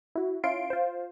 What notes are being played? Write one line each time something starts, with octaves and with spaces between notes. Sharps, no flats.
E4 F#4
C#4 E4 F4 C6 D7
F4 C5